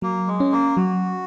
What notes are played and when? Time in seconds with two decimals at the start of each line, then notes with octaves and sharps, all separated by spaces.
0.02 F#3 A#3
0.27 G#3
0.40 C#4
0.52 A#3
0.77 F#3 F#4